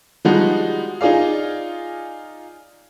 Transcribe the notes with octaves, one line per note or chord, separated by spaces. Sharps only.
F3 G3 G#3 D#4 F#4
D#4 F4 G#4 D5 F5